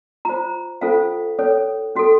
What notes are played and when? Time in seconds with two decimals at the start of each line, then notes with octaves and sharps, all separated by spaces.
0.25 F4 C5 A#5
0.81 C#4 F4 A4 C5 F5
1.39 C#4 A4 C#5
1.96 C#4 F#4 A4